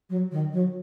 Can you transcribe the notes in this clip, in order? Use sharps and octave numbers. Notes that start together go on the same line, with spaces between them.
F#3
D#3
F#3